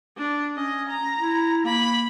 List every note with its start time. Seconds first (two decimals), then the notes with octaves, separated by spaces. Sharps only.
0.17 D4
0.56 C#4 D#5
0.88 A#5
1.20 E4
1.65 A#3 B5